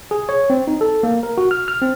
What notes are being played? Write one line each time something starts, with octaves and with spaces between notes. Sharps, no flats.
G#4
C#5
C4
D#4
A4
A#3
A#4
F#4
F6
F6
C4